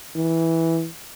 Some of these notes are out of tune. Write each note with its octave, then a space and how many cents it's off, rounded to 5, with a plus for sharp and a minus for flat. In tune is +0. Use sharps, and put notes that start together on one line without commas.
E3 -5